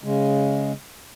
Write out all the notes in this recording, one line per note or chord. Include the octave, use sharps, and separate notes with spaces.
C#3 G#3